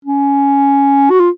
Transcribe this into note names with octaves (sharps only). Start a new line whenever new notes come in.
C#4
F#4
F4